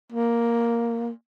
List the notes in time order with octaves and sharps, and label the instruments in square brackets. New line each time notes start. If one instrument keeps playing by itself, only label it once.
[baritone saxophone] A#3